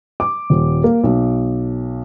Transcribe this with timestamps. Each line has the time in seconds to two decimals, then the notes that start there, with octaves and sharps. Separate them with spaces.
0.20 D6
0.50 D#1
0.84 A#3
1.04 B1